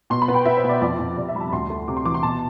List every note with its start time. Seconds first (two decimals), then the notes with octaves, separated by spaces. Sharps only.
0.10 B2 C6
0.22 B5
0.28 B3
0.34 G5
0.45 B3 E5
0.57 C5
0.64 B2
0.69 D5
0.82 F2 D5
0.99 F2
1.17 C3 D5
1.29 E5
1.34 G3 B5
1.40 A5
1.52 D2 C6
1.70 A3
1.88 C3 D6
1.97 C6
2.05 E3 D6
2.14 C6
2.23 B2 A5